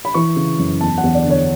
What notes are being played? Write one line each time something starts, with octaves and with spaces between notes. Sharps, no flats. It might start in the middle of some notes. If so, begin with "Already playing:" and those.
B5
E3 C#6
C#3
F#2
E2 A5
F#5
E2
D5
D3
C#5